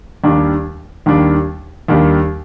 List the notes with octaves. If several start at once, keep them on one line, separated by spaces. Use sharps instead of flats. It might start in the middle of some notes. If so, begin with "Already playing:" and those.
D#2 D#3 G3 D4
D#2 D#3 G3 D4
D#2 D#3 G3 D4